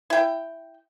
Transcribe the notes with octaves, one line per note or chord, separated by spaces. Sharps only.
E4 G5